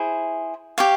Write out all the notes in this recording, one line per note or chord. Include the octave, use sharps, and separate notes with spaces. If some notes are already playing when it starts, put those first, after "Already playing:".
Already playing: E4 G#4 C5
G4 C#5 F5